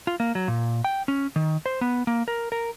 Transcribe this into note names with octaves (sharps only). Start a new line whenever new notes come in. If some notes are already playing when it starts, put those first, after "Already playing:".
F4
A#3
F#3
A#2
G5
C#4
D#3
C5
B3
A#3
A#4
A#4